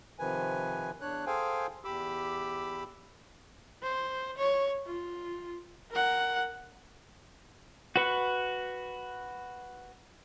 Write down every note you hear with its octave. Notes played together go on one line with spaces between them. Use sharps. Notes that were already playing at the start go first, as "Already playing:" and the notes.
C3 D#3 F3 B4 G#5
E2 D4 C#5 F#6
G#4 A4 C5 F5 G5 G#5
E2 G4 B5 D6 E6
C5
C#5
F4
A#4 F#5
F#4 B4 C#6